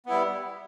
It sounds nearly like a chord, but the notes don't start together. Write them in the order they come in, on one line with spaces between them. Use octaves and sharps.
B3 E4 G3